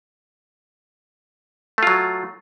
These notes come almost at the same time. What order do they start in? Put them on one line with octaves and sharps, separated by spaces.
A3 F4 F#3